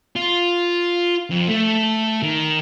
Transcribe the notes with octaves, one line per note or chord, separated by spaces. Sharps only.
F4
F2
A3
D#3